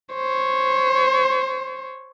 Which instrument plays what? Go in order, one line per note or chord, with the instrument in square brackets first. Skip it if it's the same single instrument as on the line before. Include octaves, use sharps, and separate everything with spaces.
[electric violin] C5 C#5